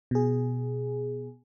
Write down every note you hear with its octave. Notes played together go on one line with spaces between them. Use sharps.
B2 G#4